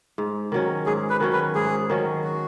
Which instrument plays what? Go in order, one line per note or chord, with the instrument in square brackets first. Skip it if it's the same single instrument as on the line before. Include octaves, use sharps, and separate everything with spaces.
[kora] G#2
D#3 F#3 C#4
[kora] G#2 [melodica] G#4
[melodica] B4
[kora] D#3 F#3 C#4
[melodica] B4
[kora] G#2 [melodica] G#4
[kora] D#3 F#3 C#4
[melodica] F#4